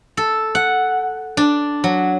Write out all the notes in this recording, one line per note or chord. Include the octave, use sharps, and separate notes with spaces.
A4
F#5
D4
F#3